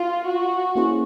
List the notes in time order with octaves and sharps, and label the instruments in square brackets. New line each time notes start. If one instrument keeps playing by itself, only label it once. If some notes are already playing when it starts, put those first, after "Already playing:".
Already playing: [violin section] F4
F#4
[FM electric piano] A#3 C#4 E4 G#4 C5